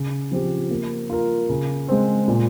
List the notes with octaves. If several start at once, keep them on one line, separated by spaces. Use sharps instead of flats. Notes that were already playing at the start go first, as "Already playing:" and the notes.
Already playing: C#3
F3 C4 G4
A#3
F4 A#4
C#3
G#3 C4
A#2